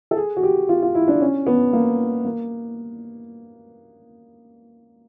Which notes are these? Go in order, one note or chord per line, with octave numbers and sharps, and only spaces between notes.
A4
G#4
F#4
G4
F4
F4
E4
D4
C#4
B3
A#3
A#3